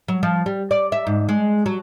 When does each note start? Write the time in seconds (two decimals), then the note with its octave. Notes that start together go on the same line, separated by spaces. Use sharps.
0.08 F#3
0.23 F3
0.46 G3
0.71 D5
0.92 E5
1.07 G#2
1.29 G#3
1.66 F#3